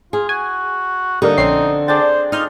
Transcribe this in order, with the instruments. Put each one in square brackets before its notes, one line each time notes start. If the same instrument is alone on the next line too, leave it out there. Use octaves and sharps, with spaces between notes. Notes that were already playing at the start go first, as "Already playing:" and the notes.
[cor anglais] F4 [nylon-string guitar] G#4
[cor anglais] F#4 [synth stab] G#5
[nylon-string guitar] D3 [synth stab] G3 A#3 [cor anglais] D#4
[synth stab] A#1 C#4 C7 [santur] C4
[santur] D4 G#4 G5 [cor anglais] C5 [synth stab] A6
[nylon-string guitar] D#4 [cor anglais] F4 [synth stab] D#6 F6 G6